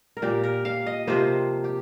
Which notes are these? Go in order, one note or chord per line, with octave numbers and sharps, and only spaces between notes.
A#4
A#2 A#3 G4
A#4
F5
D#5
C3 F3 A#3 C5
G4